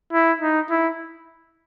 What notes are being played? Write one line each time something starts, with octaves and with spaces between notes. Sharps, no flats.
E4
D#4
E4